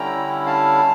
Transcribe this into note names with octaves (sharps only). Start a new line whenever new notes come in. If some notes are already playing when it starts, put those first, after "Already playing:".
Already playing: D3 G3 C#4 E4 G5 A#5
F5 A5